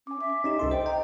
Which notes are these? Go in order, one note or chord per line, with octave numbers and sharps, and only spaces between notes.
C#4 G#5 D6
E5 D6
C#4 D#4 G4 D#5 E5
C2 D#4 A4 C6
C5 G5
D#5 G5 A#5